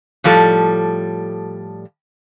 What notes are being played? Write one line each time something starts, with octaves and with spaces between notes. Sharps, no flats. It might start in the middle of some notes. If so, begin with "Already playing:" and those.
A2 F3 G3 A4